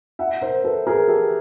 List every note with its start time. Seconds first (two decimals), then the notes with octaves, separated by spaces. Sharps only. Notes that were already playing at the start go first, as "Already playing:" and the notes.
0.19 E5 F#5
0.42 A#4 C5
0.64 A4 B4
0.87 G#4 A#4
1.08 G4 A4